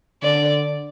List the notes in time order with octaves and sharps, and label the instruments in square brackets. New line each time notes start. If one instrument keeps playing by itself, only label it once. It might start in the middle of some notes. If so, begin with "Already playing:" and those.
[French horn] D3 [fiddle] D5